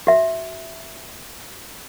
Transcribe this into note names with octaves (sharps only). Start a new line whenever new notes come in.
F#4 E5